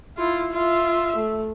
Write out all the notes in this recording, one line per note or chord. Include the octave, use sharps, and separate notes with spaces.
E4 F4
F4 E5
A3